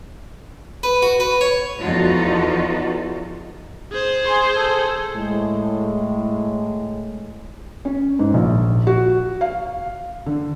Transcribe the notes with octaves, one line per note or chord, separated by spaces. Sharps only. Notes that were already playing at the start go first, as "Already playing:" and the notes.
B4
F#4
B4
C#5
E2 F3 D#4 F4 F#4 A4
G#4 C5
G#5 C6
A4
A2 G#3
C#4
G#2
A#1
F#4
F5
D3